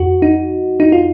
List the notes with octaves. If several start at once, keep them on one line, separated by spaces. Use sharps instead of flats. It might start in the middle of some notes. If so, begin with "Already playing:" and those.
Already playing: F2 F#4
D#4
D#4
F4